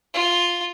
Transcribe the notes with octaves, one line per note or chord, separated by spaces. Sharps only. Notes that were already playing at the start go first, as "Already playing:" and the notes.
F4